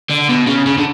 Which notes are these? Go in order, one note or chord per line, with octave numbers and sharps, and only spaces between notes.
D3
B2
C#3
C#3
D3